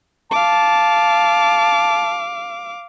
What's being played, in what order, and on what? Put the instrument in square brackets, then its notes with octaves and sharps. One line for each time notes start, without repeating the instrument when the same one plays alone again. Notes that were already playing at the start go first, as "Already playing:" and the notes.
[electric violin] F5 D6 [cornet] A5